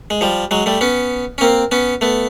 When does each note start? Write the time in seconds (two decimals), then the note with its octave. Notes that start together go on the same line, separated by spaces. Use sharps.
0.10 G#3
0.21 F3 G3
0.51 F#3 G#3
0.66 G3 A3
0.81 B3 C#4
1.38 C#4
1.41 A#3 C4
1.72 B3 C#4
2.01 A3 B3